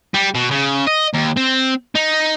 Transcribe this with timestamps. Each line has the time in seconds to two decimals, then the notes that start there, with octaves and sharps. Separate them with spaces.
0.14 G3
0.35 B2
0.51 C#3
0.87 D#5
1.14 D#2
1.37 C4
1.95 D#4